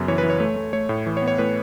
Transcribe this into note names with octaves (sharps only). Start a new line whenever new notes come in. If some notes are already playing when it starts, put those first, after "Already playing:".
Already playing: F#2 C#3 B3
E3 C#5
B4
E3
C#5
A3 C#5
A3
A3 C#5
A2
E3
C#5
B3
C#5
A2 B4